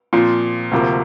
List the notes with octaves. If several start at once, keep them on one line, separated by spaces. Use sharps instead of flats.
A#2 F3 C4
D2 C3 F3 A#3